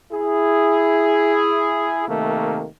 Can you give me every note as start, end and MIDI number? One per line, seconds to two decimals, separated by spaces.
0.12 2.07 64
0.12 2.07 68
2.08 2.67 48
2.08 2.67 51
2.08 2.67 57
2.08 2.67 58